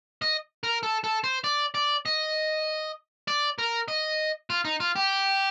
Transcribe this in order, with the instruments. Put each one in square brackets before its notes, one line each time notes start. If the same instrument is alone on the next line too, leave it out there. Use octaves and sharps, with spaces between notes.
[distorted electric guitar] D#5
A#4
A4
A4
C5
D5
D5
D#5
D5
A#4
D#5
F4
D#4
F4
G4